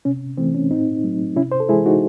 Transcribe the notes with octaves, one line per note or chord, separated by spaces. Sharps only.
C3 C#4
E3 A3 C4
C#4
A2 C4 D#4
F#3 A3
C3 C#4 E4
C5
A4
E3 G#3 E4 G#4
D#4 F#4